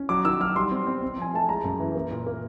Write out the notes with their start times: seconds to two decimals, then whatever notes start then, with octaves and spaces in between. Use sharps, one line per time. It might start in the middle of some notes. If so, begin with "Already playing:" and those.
Already playing: C#4
0.09 F#3 D6
0.25 D#3 E6
0.40 F#3 F6
0.56 G3 C6
0.71 C4
0.87 C4
1.02 C4
1.18 F3 G#5
1.34 A3 A5
1.49 G#3 A#5
1.64 F#2
1.80 E3
1.95 A#3
2.11 A#2
2.27 A#3